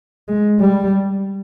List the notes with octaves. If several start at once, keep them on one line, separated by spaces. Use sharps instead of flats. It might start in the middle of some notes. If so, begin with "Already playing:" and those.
G#3
G3